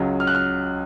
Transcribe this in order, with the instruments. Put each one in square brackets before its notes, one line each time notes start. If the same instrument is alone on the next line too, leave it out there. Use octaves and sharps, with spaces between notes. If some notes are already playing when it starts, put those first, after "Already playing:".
Already playing: [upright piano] C#2 C#3 F#3
F6
F#6
F6